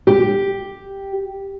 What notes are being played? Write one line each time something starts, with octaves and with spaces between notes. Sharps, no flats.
G4